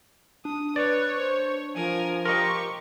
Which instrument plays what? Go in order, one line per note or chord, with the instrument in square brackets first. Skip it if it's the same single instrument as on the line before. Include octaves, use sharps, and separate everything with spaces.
[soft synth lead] D4 [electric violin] D#6
[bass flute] B4 [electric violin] C#5 [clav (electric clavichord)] D5
[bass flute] C5
[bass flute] F3 [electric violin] A#4 G#5
[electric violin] G4 C#6 [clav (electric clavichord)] A#4 D#5 [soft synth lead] C6